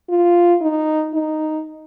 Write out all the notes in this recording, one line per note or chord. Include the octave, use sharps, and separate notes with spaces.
F4
D#4
D#4